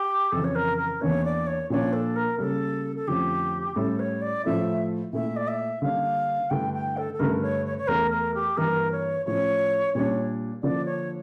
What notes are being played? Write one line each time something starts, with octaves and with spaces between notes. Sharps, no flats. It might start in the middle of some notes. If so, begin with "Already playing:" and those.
Already playing: G4
F2 C#3 E3 A4
C#5
A#4
A#4
E2 E3 A#3 D4 C#5
D5
C#5
A#2 F3 A#3 D4 C#5
A4
A#4
C#3 G3 A#3 A4
A4
F2 D3 F3 A3 C#4 G4
A2 G3 C#4 E4 A4
C#5
D5
A2 F3 A3 E4 E5
A#2 A3 E4 E5
D5
E5
D3 G3 A#3 D4 F5
G2 D3 A3 E4 G5
G5
A4
A4
G2 D3 A3 A#4
C#5
C#5
C#5
E2 E3 A3 E4 A#4
A#4
G4
G2 E3 A#3 A#4
C#5
A2 F3 C#4 E4 C#5
A#2 G3 D4 C#5
D3 F3 A#3 D4 D5
C#5